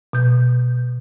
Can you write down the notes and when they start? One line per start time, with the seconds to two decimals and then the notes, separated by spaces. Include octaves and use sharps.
0.13 B2 G6